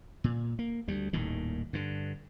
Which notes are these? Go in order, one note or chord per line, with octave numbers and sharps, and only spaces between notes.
A#2
A#3
D2 G3
D#1 D#2 A2 D#3
G2 D3